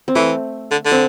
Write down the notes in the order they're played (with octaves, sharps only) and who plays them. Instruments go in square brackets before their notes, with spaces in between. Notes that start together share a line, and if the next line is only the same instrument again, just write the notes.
[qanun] C4
[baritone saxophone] E3 [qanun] A3
[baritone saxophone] D3
D3
[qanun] C4